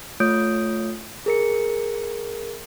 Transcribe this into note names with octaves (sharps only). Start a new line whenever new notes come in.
A3 F4 C#5 D#6 G6 D7
G#4 A#4 C#7